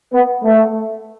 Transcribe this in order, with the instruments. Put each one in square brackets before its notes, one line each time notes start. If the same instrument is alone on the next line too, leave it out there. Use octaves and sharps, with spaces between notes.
[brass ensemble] B3
A3